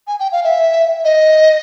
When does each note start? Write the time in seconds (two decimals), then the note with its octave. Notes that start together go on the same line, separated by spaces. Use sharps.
0.07 G#5
0.20 G5
0.32 F5
0.44 E5
1.04 D#5